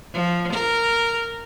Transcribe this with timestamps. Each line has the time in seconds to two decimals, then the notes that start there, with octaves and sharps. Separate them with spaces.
0.13 F3
0.53 A#4